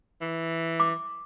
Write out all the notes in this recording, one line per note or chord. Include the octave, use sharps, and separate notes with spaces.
E3
D6